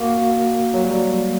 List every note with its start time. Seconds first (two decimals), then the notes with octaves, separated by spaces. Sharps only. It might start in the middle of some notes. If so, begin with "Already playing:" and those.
Already playing: A#3 F#4
0.74 F#3
0.85 G3